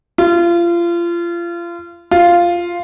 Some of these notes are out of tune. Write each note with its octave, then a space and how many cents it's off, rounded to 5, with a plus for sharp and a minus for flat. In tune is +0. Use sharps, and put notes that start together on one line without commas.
F4 -30
F4 -5